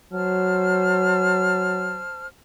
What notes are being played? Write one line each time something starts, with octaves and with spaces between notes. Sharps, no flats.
F#3 C5 A5 F6